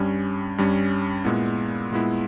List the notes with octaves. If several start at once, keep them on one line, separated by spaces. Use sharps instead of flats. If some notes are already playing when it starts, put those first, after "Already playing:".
Already playing: G2 G3 C#4
G2 G3 C#4
A#2 G#3 B3 E4
A#2 G#3 B3 E4